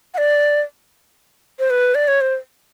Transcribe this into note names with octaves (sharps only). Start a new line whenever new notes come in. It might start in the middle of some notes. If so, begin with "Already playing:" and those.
F#5
D5
C5
B4
D5
C#5
C5